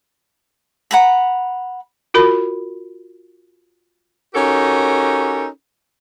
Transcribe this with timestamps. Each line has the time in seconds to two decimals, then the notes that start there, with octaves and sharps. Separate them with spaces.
0.91 F#5 A#5 B5
2.14 F4 F#4 A#4 B5
4.34 C#4 D#4 F#4 G4 A4 A#4